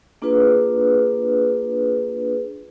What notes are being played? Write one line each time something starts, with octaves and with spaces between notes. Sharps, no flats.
A#3 D4 F4 G#4 B4